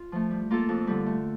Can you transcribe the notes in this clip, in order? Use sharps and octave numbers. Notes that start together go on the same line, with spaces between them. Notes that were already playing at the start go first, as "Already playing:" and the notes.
Already playing: F4
F3 A3
G3
A#3 F4 A4
F2
D3 G3
A3